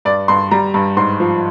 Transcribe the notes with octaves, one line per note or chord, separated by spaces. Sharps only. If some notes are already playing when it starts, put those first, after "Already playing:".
G2 D5
G2 C6
G3 A#5
G2
G#2 C6
F3